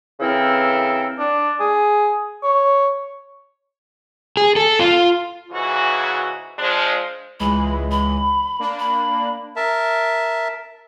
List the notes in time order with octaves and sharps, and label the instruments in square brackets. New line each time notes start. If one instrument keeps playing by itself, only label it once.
[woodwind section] C#3 E3 C4 E4 A4 A#4
[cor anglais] D4
G#4
C#5
[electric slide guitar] G#4
A4
F4
[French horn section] G#2 C#3 E3 F#4
F3 G#3 D4 C5
[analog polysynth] C#2 E3 G#3 [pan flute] B5
[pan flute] B5
[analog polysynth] A#3 D4
[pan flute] B5
[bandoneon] A#4 E5 A5